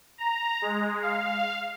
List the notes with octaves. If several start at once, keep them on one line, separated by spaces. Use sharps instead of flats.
A#5
G#3
F5